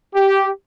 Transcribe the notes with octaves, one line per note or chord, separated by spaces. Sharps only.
G4